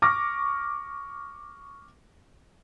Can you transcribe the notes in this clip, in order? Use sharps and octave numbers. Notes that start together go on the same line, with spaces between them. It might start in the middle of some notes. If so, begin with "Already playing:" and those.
C#6 D6 F6 A#6